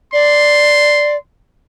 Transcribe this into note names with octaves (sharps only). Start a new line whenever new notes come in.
D5 C6